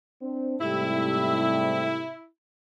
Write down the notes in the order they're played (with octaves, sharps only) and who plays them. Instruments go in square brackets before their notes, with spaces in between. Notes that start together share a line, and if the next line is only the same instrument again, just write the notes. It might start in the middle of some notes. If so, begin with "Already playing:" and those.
[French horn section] C4 D4
[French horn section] G#2 C3 [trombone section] G3 A3 G4 [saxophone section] E4